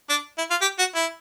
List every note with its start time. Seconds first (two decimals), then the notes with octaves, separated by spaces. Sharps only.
0.10 D4
0.38 E4
0.51 F4
0.62 G4
0.79 F#4
0.95 E4